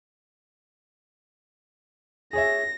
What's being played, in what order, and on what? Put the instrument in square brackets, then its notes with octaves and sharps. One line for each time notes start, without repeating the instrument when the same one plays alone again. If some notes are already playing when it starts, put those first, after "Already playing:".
[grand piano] G#4 C#5 E5 [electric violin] A#6